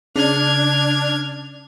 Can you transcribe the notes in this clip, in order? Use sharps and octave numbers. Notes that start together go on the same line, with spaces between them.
C#3 D4 F6 G#6